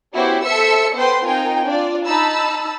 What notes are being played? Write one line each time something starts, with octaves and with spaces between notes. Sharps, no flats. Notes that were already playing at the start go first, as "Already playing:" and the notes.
B3 C#4 E4 F#4 G4 C5
A4 C5 E5 E6 C#7
B3 A4 B4 C5 G5 C6
C4 D#4 F4 A#4 G5 G#5
D4 F4 D5
D#4 A5 B5 E6